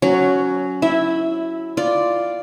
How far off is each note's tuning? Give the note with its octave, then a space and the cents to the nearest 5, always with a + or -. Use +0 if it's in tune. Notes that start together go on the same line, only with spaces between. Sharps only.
F#3 +0 C#4 +15
E4 +0 E5 -15
F4 +0 D5 +0